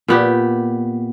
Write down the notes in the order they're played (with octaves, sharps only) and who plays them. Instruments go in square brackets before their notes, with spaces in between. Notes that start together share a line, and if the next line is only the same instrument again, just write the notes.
[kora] A#2 B3 G4